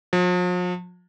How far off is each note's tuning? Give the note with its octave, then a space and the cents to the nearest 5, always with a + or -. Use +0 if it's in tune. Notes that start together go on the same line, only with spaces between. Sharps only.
F3 +45